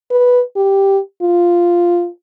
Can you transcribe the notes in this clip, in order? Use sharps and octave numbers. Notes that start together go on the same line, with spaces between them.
B4
G4
F4